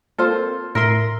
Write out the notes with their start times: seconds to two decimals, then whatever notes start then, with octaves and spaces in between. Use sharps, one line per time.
0.18 A#3 C4 F4 A4 C5
0.75 A2 A#4 E5 C6